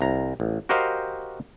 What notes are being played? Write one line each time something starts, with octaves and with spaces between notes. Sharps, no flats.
C2 A#5
A1
F#4 G4 A#4 C5 D#5 F5